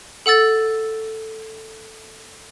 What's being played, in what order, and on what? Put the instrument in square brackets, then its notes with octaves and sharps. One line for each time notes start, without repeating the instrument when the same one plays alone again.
[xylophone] A4 F#5 E6 A6